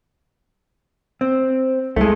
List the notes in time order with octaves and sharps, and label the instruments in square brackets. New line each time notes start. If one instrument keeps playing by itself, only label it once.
[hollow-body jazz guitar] C4
[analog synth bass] C2 [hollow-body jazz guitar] G#3 A3